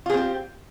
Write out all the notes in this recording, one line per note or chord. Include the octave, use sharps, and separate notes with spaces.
C4 F4 G4 G#4